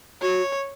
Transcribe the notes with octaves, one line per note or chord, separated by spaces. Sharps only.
F#4 C#5